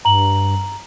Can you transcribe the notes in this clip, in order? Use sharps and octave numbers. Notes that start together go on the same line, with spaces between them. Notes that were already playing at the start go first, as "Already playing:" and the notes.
G2 A#5 F#7